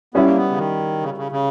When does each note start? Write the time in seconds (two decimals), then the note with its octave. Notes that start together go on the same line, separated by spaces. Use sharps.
0.14 G3 B3 C#4 E4
0.26 A#3
0.36 B3
0.50 C#3
0.58 D#3
1.02 C#3
1.18 C#3
1.32 C#3